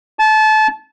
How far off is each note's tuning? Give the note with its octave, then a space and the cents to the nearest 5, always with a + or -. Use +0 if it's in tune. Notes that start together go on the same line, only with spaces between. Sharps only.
A5 -25